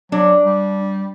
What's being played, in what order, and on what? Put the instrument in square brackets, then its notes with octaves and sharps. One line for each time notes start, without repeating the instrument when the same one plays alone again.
[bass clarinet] F#3 [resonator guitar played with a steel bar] D4
[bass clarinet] G3